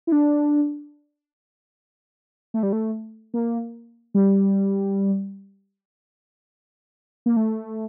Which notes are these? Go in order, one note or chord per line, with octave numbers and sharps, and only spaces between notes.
E4
D4
A3
G3
A3
A#3
G3
A#3
A3